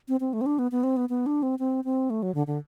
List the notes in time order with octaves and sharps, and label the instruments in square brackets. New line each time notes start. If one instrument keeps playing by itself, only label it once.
[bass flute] C4
C4
A3
C4
D4
B3
B3
C4
B3
B3
D4
C4
C4
C4
A3
F#3
D3
D3